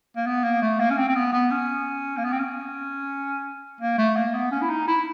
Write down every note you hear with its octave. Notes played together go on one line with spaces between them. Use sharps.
A#3
B3
A#3
A3
A#3
C#4
C4
C4
B3
B3
C#4
A#3
B3
C4
C#4
A#3
A3
A#3
B3
C#4
E4
D#4
E4